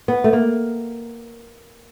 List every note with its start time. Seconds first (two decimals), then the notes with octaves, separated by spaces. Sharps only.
0.08 B3
0.24 A3
0.33 A#3